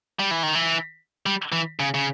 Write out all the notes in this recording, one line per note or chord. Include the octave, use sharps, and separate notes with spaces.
G3
E3
D#3
E3
G3
E3
C#3
C#3